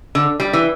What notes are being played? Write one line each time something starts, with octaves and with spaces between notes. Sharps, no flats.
D3
G3
E3